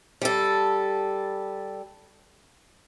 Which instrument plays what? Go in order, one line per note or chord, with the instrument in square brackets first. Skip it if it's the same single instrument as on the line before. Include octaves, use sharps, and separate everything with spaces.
[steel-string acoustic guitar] G3 A4